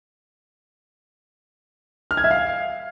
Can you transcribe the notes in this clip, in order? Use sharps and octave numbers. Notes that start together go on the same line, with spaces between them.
F6
G#6
E5
F5